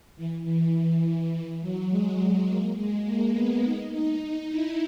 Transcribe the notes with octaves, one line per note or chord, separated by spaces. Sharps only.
E3
E3
E3
E3
F#3
G#3
A#3
G#3
A#3
B3
D#4
D#4
D#4
E4